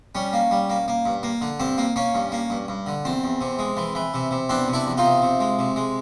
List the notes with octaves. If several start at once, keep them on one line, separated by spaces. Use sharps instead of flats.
G3 C#4
A#3
G3
A#3
A#3
G2
A#3
D3
G2 C4
A#3
A#3 C#4
G2
A#3
G2
G2
D3
E2 C4
E2
C3
G#3
E3
E3
C3
C3
E2 C4 D4
C3
D4 E4
E2
D#4 F4
C3
C3
G#3
C3
G#3